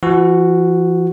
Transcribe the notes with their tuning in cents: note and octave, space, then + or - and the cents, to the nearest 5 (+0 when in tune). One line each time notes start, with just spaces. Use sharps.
F3 -45 F#4 +0